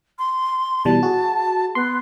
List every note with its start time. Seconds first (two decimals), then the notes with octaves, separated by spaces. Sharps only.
0.19 C6
0.85 B2 E3 G3 A5
1.03 F#4 G#4
1.75 B3 C6